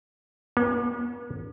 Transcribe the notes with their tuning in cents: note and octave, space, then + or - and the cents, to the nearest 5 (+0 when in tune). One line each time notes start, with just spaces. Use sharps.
B3 -45